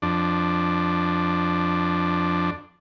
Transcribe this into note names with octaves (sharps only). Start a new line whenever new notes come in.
F2 D4